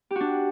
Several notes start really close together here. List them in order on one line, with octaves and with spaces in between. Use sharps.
G4 F#4 D4